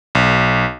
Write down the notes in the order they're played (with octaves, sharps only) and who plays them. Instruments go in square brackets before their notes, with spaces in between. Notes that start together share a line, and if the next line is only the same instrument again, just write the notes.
[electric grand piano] B1